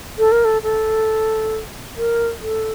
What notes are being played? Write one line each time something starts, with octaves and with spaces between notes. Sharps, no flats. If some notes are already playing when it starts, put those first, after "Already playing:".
A4
A#4
A4
A4
A#4
A4